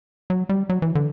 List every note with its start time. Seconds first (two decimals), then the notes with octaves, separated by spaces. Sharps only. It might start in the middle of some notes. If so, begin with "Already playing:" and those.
0.30 F#3
0.49 G3
0.69 F#3
0.82 E3
0.95 D3